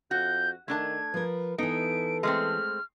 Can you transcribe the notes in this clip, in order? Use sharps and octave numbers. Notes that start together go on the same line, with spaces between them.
F2 F#4 G6
D#3 A3 D4 A5 G#6
F3 A#4 B4
E3 B3 D#4 A4 D7
G#3 A3 C4 F6